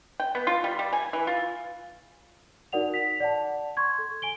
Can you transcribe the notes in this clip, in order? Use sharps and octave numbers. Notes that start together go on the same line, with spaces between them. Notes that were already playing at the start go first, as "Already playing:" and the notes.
G5
B3
F4
G3
G3
G#5
E3
F4
D#4 F#4 A#4 D5 F#5 F7
B6 F7
D5 F#5 A5
C6 C#6 G#6
A4
G#5 D7 G7